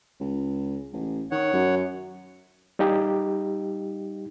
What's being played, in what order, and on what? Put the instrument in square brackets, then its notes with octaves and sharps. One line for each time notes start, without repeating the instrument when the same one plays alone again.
[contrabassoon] C#2
A1
[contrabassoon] D#3 [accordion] C#5 F#5
[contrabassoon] F#2
[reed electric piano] G3 D#4 G4